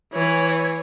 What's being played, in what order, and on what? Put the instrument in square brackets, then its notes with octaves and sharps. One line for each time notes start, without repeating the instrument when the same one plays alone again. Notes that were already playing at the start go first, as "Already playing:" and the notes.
[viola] E3 C#5